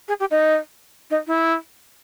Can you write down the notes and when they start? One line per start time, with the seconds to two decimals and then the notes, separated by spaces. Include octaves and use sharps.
0.08 G#4
0.20 G4
0.31 D#4
1.10 D#4
1.27 E4